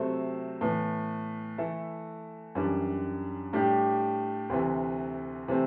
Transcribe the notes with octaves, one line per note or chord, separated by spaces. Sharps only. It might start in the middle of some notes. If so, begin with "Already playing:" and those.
Already playing: C3 F#3 A3 C4
A2 E3 B3
E3 A3 E4 A4
F#2 E3 G3 D4
A2 G3 D4 G4
D2 C3 E3
C3 E3 A3 C4